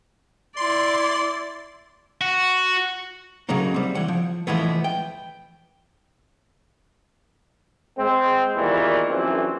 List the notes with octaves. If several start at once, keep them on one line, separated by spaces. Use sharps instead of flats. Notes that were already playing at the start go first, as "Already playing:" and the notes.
E4 D5 C6
F#4
C#3 F#3 A3 A#3 D#4
G3 C4
E3 F#5
F3
E3 F3 G#3 A3 B3
G5
G#3 C4
E2 A#2 D#3 E3 G3
A#1 F#2 E3 C4